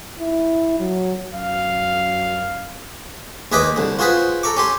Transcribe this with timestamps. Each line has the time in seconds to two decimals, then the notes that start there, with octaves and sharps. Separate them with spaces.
0.20 E4
0.79 F#3
1.34 F#2 F5
3.52 D#2 G#4 B4 D#5 G5 D6
3.76 C2 D3
3.99 F4 F#4 G#4 B4 C5
4.43 A4 A#5 C#6 D6
4.57 C#4 G4 C6